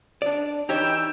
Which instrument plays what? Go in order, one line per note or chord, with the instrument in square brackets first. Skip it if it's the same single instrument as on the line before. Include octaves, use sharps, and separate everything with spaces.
[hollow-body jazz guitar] D4 D5
[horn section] E3 G5 [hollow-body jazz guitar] D#4 G4 C#5 [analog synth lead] E6